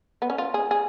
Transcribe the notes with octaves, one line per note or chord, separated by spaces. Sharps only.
B3
C#4
F4
G#4
G#4